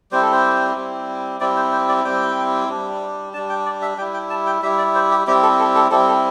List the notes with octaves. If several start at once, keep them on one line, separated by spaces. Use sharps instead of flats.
G3 C4 E4 C5
A4
C5
G3 C4 E4
G3 C4 E4 D5
C5
C5
D5
G3 C4 E4 G5
G3 D4
G3 D4 A5
G5
D5
E5
G3 E4 G5
G5
A5
G5
G3 E4 E5
D5
C5
G4
G3 C4 E4 G4
A4
A4
A4
G3 C4 E4 A4
A4